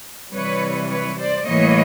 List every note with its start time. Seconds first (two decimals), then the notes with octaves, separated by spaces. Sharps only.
0.34 C3 E3 G3 B4 C#5
0.90 B4 C#5
1.18 C5 D5
1.46 A2 E3 G3 A#3 C#5 D#5